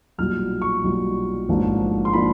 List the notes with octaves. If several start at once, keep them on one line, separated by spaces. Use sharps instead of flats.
B1 A#2 G3 F6
C#6
B1 A#2 G3
A1 G#2 F3 A#3 D4
C6
F3 A#3 D4 B5